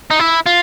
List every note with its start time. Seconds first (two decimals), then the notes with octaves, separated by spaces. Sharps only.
0.10 D#4
0.19 E4
0.46 F4